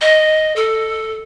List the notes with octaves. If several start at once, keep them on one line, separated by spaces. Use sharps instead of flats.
D#5
A4